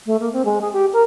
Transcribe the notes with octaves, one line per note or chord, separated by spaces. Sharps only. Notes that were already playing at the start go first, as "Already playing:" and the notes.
A3
A#3
C4
G#3
G#4
G4
A#4